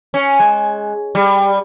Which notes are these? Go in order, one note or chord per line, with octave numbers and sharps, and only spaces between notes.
C#4
G#3
G3